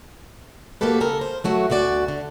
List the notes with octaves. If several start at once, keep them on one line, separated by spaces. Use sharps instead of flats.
A#3 B3 F#4 G4 A4 B4
C#3 A4 A#4
C5
F#3 A3 F#4
D2 D3 F#4 D5
D3